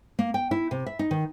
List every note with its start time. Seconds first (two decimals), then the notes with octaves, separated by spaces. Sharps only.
0.19 A#3
0.34 G5
0.51 E4
0.71 C3
0.86 E5
0.99 D#4
1.11 D#3